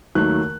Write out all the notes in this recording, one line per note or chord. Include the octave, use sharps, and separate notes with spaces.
D#2 D#3 F#3 A3 F#6